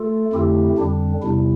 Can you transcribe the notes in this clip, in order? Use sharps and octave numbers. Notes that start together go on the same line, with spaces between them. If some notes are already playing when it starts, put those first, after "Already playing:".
Already playing: A3 F4 A4
F2 D3 A3 C4 E4 G4
F2 D3 G3 C4 D4
E2 C3 G3 E4